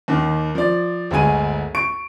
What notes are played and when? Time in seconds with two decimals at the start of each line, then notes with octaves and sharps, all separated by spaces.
0.08 D#2 D#3
0.55 F3 D5
1.11 G1 D2 G#3 G#5 D#7
1.75 C#6 D7